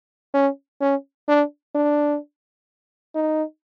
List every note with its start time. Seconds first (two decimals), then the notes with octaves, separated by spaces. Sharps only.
0.34 C#4
0.81 C#4
1.28 D4
1.75 D4
3.15 D#4